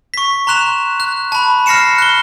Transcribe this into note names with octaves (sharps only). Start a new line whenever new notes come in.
C#6 B6
A#5 C6 F#6 E7 F7
F#6
A5 B5
F6 A#6 C7 C#7 E7
F#6 G7